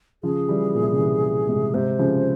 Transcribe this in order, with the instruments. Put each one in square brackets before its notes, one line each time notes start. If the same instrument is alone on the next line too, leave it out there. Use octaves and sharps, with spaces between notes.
[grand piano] C#3 F3 [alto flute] G#4
[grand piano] E3 G3
A#2
C3
C#3
C3 E3
G#2 C3
[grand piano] G#2 C3 [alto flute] C5
[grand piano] C#3 F3